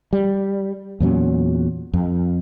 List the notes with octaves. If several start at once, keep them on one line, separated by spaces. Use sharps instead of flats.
G3
E2 A#2 F#3 C#4
F2